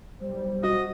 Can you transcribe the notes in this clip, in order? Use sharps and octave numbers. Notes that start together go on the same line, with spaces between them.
B1 G3 C5
F#4 D#5